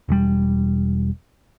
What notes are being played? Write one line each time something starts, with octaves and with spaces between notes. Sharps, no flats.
E1 G3